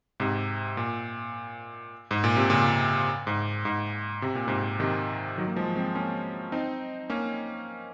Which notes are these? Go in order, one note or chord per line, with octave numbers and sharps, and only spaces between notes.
G#2 C3
A#2
G#2
A#2
C3
A#2 C#3
G#2
G#2
C3
A#2
G#2 C3
C3 D#3
D#3 F#3
A#3
F3 G#3
G#3 C4
A#3 C#4
C4 D#4
A#3 C#4